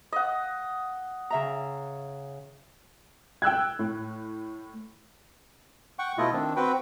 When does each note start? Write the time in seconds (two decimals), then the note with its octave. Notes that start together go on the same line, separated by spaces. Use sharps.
0.12 D#5 F#5
1.30 C#3 E5 A#5
3.42 G5 E6 F#6 G#6
3.79 A2
5.99 F#5 G5 C#6
6.18 B2 A3 E4 F4 D#5
6.32 D#3 C4 D4
6.56 C4 F#4 B4 G5